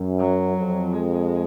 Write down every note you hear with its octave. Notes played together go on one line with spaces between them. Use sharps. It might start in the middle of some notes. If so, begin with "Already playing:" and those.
Already playing: F#2
F#3
F2
G#3